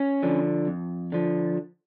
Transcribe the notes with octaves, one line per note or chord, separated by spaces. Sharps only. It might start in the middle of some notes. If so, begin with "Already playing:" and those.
Already playing: C#4
D3 F3
F2
D3 F3